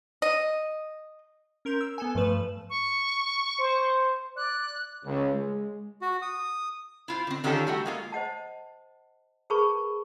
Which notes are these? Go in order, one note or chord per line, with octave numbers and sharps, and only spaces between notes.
D#5
C#4 A#4 C6 G6
E6
B3 A4 G#5
G2 F3 A3 B4 E7
C#6
C5
D5 F#6
C#2
G#3
F#4
D#6
E4 F4 C5
D3 C4
D3 D#3 C#4 F4 G4 A4
G3 A3 F#4
G#3 A#3 F4
C5 D#5 F#5 A5
G#4 A#4 B4 A5 B5 C#6